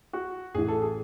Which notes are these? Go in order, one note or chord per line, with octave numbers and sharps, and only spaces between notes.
F#4
A1 A2 E3 G#4
A4
G#4